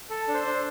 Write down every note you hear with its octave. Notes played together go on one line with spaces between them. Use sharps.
A4
D4
C5
D4